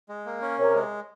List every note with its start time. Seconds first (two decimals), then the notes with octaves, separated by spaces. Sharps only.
0.09 G#3
0.26 A#3
0.42 C#4
0.58 C3 A#4 C#5
0.75 G#3